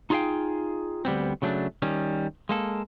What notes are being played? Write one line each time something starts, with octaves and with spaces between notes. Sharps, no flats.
D#4 F4 G#4 C#5 F5 G5
D2 G3 B3 C4
C#3 F#3 A3 D4
D#3 G3 C#4
G#3 A#3 A4